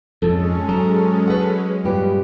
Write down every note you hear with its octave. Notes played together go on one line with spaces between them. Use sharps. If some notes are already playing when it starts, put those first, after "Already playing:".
F2 G#2 G#3 C#4 A4
G#2 F#3 A#5
B4 F#5
G2 A#2 G4 B4